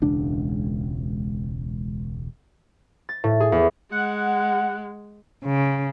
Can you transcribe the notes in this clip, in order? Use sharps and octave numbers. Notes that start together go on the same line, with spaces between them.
E1 C#2 D4
A6
A2
G#4
E2
G#3 F#5
C#3